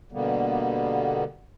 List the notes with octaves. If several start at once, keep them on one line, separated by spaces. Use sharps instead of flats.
B2 D3 G3 A#3 B3